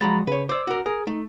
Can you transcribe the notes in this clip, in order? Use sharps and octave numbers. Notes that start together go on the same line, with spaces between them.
F3 F#3 G#3 A#5 B5 A6
C#3 B4 C#5
C5 D5 D6 E6
F#4 A#4
G#4 A#4
A3 D#4